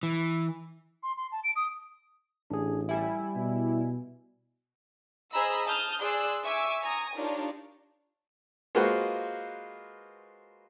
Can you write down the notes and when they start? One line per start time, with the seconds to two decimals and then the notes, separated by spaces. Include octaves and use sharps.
0.03 E3
1.03 C6
1.17 C6
1.32 A5
1.44 D7
1.56 D#6
2.50 A1 D4 G#4
2.89 G3 E4 E5 G#5
3.36 B2
5.32 G#4 C5 D#5 A#5 B5 E6
5.65 A5 D#6 F6 G6
6.00 G#4 D5 C6 E6 F#6
6.43 E5 G#5 C#6 D6 E6
6.81 G#5 A#5 C#6 D#6
7.15 D4 D#4 F4 G4 A#4 C#5
8.75 G#3 A#3 F4 F#4 B4 C5